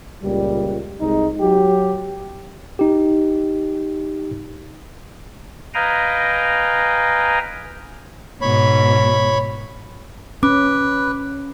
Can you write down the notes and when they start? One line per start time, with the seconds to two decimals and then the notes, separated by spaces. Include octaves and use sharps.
0.23 C#2 A#2 G3
1.01 C2 G#3 D#4
1.41 F#3 G4
2.79 D#4 G4
5.74 B4 D#5 F5 G5 G#5 A#5
8.41 G#2 B2 C#5 B5
10.43 C#4 B4 D6